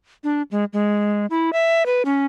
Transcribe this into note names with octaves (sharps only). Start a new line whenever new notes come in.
D4
G#3
G#3
E4
E5
B4
C#4